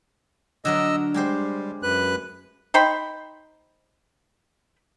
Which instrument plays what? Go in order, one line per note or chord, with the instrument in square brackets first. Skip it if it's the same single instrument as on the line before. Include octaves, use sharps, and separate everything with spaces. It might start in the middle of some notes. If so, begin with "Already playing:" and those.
[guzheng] D3 F#3 A#4 [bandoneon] D#5 E6
[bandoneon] G3 [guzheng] G#3 G4 C5
[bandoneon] F#2 B4 F#6
[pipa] D#4 C5 G5 B5